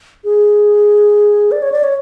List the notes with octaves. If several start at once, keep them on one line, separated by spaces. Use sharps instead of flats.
G#4
D5
C#5
D5
C#5